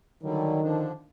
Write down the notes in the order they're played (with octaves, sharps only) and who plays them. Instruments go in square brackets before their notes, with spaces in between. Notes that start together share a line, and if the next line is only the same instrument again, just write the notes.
[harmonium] D3 F#3 G3 [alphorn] D#3
[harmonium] D3 F3 D4